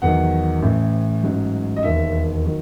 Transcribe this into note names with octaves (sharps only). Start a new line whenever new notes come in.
E2 D#3 F#3 F#5
A1 A2 E3
A1 G#2 F#3
D#5
E1 D#2 D#3 E5
D#3 F#3